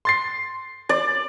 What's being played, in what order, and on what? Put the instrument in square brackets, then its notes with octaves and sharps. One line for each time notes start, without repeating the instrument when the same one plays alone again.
[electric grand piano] C6 A6 C7
[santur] D5